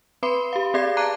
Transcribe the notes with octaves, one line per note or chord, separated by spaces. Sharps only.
C4 B4 B5 C6 C7 G7
G4 F5
C4 G#4 D5 F5 G#6 C7
A5 A#5 D6 F#6 C7 D#7